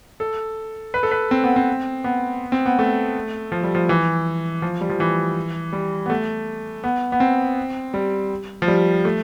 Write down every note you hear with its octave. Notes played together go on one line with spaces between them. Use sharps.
A4
B4
A4
B4
C4
B3
C4
B3
C4
B3
A3
F3
G3
F3
E3
F3
G3
F3
E3
G3
B3
A3
B3
B3
C4
G3
F3
G3
A3